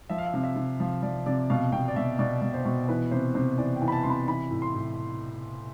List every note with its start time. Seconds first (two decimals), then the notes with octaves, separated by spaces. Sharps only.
0.09 F3 E5
0.18 F5
0.26 E5
0.34 C3 F5
0.43 E5
0.56 C3
0.80 F3
1.03 F3 D5
1.26 C3 D5
1.50 B2 F5
1.72 B2 G5
1.88 D5
1.96 B2 E5
2.19 B2 D5
2.42 B2
2.54 C5
2.65 B2
2.89 E3 B4
3.11 C3 C5
3.35 C3 C5
3.58 E3 D5
3.76 G5
3.81 E3
3.88 B5
3.92 A5
4.03 C3 C6
4.10 B5
4.28 E3 B5
4.51 A2
4.62 C6
4.75 A2